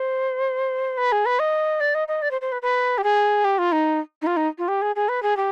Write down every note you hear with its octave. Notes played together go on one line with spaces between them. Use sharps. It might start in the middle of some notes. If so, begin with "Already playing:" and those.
Already playing: C5
B4
G#4
B4
D#5
D5
D#5
D#5
D5
C5
C5
B4
B4
G4
G#4
G4
F4
D#4
D#4
F4
D#4
F4
G4
G#4
G#4
B4
G#4
G4